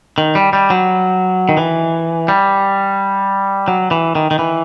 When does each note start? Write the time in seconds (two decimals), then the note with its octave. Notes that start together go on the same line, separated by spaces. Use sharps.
0.18 D#3
0.35 G3
0.53 G3
0.70 F#3
1.49 D#3
1.57 E3
2.28 G3
3.68 F#3
3.91 E3
4.15 D#3
4.31 D#3
4.39 E3